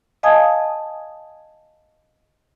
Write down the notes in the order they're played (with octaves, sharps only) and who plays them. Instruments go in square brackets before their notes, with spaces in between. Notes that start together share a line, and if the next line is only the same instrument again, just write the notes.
[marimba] D#5 F5 G#5 A5 D#6 G#6